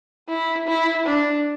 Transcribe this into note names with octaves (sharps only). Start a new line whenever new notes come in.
E4
E4
D4